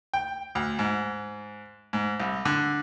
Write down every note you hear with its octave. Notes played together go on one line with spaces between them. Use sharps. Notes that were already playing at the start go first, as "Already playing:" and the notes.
G5
D2
G#2
G#2
C2
D3